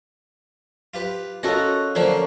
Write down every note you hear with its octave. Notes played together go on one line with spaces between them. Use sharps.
F4 G4 B4
C#4 F4 F#4 A4 A#4 D#5
D3 F3 A3 A#3 C#4 D4